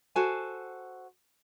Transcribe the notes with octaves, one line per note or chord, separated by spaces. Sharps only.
F#4 A4 C5 G#5